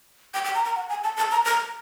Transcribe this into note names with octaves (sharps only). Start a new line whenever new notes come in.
G5
G5
A#5
A#5
F#5
G#5
A5
A5
A#5
A#5